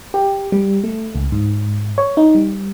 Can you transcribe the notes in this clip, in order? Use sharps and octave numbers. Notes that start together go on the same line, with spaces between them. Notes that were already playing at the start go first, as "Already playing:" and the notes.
G4
G3
A3
C#2
G#2
C#5
D#4
G3